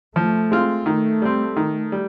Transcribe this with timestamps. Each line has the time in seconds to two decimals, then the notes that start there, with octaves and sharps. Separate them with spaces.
0.16 F3 A3
0.51 G#3 C4 F4
0.86 D#3 A3
1.22 G3 C4
1.56 D#3
1.92 G3